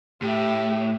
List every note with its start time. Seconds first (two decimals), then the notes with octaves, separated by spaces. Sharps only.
0.22 A2 G4 E5